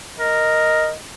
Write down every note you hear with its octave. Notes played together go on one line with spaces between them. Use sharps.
A#4 D#5